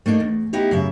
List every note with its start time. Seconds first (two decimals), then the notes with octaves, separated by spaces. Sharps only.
0.06 A3 A#3 D4 D#4
0.20 E2
0.53 B3 D#4 E4 G4
0.71 F#2 C#3 E5